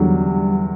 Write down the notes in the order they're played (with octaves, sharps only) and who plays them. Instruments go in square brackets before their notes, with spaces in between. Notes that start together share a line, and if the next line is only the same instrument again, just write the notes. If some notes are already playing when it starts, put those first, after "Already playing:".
Already playing: [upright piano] E2 D3 F#3 [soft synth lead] G3